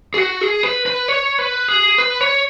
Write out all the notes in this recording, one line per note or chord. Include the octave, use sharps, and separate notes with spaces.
G#4
F#4
G#4
B4
B4
C#5
B4
G#4
B4
C#5